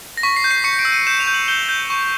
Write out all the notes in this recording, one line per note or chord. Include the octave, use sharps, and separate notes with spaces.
A#6
C#6 B6
C7
G6
C7
C#6 C#7
D7
E6
D#7
G6 E7
F7
G6
F#7
G6 G7
G6
C#6